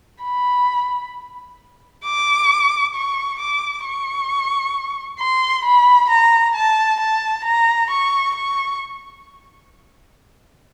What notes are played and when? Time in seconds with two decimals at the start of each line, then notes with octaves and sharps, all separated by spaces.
0.24 B5
2.05 D6
2.94 C#6
3.39 D6
3.85 C#6
5.20 C6
5.65 B5
6.10 A#5
6.56 A5
7.00 A5
7.45 A#5
7.91 C#6
8.35 C#6